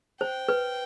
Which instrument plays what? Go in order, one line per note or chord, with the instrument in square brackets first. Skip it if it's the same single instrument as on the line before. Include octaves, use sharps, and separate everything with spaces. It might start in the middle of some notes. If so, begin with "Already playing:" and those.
[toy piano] C5 [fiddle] G5
[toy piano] B4